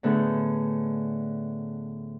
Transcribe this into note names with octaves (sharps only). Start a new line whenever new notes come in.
A2 D3 A3 B3 G#4